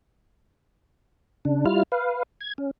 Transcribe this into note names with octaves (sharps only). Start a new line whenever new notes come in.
C#3 D4
G3 E4 F4 F6
B4 F5
G#6
C#4